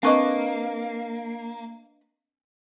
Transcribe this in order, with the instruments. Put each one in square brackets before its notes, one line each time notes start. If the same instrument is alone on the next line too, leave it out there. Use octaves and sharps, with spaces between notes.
[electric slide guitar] A#3 [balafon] C4 C#6 D6 [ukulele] D4 B4 D#5